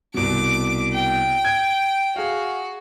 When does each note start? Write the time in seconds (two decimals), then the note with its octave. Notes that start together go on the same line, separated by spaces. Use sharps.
0.14 C2 B2 D6
0.93 G5
1.45 G#6
2.16 F#4 G#4 F5